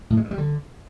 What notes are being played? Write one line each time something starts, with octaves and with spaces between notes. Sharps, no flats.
A2
G#3
G2
G3
D3